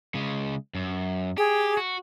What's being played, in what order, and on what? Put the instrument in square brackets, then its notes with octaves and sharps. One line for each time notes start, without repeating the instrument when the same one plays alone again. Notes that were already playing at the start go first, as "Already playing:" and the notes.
[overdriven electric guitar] C#3 G#3
F#2
[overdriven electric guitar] G4 [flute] G#4
[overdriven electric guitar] F#4